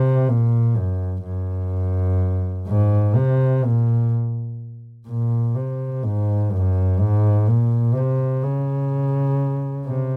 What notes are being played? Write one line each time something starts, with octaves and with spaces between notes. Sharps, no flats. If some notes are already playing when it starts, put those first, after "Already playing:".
Already playing: C3
A#2
F#2
F#2
G#2
C3
A#2
A#2
C3
G#2
F#2
G#2
A#2
C3
C#3
C3